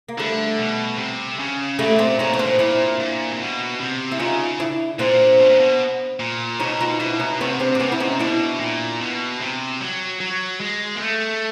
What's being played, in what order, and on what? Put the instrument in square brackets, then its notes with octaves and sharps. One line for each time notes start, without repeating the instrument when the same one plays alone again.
[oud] A#3
[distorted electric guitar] D3 [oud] G3 A3
[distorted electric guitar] B2
C3
C#3
[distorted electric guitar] A#2 [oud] G3 A3
[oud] C4 D4
[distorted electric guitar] A#2 [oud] C#4 D#4
[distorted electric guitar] B2 [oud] C#4
[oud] C4 D4
[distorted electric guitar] A#2
[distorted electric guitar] A#2 [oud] D4 E4
[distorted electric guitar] A#2
C3
B2
C3
[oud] E4
[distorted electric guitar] C#3 [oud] D#4 F4
[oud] D4 E4
[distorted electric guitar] A#2 [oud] C4 D4
[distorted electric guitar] B2
A#2
B2
A#2
[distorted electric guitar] B2 [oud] C#4 D#4
[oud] D#4 F4
[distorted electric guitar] B2 [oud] D4 E4
[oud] C#4 D#4
[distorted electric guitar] C3 [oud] B3 C#4
[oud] C4 D4
D4
[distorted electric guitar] C3 [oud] B3 C#4
[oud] E4
C#4 D#4
[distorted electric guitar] B2 [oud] D4 E4
[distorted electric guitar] A#2
B2
C3
F#3
F#3
G#3
A#3
A3